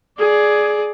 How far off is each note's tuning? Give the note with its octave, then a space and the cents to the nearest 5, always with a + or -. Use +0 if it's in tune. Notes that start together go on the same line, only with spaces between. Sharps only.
G#4 +15 D5 +0